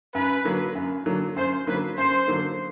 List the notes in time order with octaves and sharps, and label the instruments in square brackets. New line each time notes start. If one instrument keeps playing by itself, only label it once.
[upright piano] F#2 [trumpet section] B4
[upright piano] D3 F#3 A#3
F#2
D3 F#3 A#3
[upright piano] F#2 [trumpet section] C5
[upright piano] D3 F#3 A#3 [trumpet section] B4
[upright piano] F#2 [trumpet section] C5
[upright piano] D3 F#3 A#3